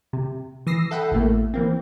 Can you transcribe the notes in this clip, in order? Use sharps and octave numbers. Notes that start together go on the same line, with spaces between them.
C3
E3 D#6 E6 A#6 C7
A4 E5 F#5 G5 B5
A1 A2 A3 A#3
E3 A#3 C4